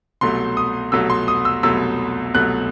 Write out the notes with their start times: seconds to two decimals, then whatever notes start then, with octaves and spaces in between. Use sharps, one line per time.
0.21 C2 B2 F#3 A3 C6
0.57 D#6
0.92 C2 B2 F#3 A3 E6
1.10 C6
1.28 D#6
1.45 E6
1.63 C2 B2 F#3 A3 E6
2.34 C2 B2 F#3 A3 F#6